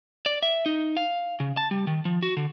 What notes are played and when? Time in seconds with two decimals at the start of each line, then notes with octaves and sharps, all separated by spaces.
0.26 D5
0.43 E5
0.66 D#4
0.97 F5
1.40 C#3
1.57 A5
1.71 G3
1.87 D#3
2.05 F3
2.23 F#4
2.37 D3